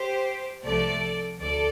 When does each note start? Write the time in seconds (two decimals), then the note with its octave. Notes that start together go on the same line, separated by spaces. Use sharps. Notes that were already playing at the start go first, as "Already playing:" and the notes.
Already playing: G4 C5
0.65 C2 C3 F3 A3 A4 D5
1.40 D2 A4 D5